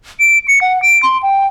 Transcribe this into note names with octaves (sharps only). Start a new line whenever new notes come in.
D7
C#7
F#5
D7
C6
G5